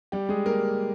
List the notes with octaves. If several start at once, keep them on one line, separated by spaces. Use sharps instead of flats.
G3 G4
G#3 G#4
A#3 A#4